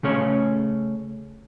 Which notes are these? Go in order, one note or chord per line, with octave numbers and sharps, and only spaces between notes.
C#3 A3 C#4 C#5